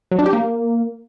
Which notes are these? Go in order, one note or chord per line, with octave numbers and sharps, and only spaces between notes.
F#3
D4
G4
A#3